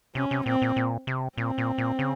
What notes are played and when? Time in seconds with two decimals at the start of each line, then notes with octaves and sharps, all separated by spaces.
0.15 C3 C#4
0.31 C3
0.46 A#2 C4
0.62 A#2
0.76 A#2
1.07 C3
1.38 A#2 C4
1.58 A#2
1.78 A#2
1.99 C#3